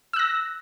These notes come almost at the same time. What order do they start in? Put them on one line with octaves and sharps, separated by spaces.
E6 F#6 A#6